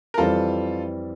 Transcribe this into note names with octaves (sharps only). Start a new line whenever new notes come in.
A#4
F2 E3 G3 C4 F4 A4